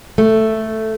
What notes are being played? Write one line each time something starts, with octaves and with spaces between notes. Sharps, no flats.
A3